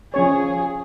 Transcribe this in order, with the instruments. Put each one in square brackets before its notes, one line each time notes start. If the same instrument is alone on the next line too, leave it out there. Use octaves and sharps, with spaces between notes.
[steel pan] F3 C#4 C#5 [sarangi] G#4